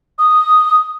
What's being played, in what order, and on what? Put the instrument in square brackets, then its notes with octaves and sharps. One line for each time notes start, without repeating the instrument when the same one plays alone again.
[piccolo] D#6